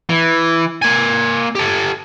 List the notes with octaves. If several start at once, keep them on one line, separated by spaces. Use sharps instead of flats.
E3
A#3 G#5
G4 A4